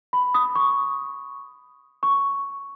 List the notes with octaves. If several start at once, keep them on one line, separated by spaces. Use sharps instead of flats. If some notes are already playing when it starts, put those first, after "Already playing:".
B5
D#6
C#6
C#6